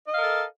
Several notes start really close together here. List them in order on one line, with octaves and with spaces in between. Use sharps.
D#5 F5 A#4 A4